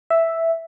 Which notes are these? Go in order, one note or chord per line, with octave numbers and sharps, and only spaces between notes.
E5